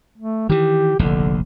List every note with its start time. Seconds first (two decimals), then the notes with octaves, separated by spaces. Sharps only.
0.18 A3
0.49 D#3 E3 G4
0.99 F1 A#1 D#2 D3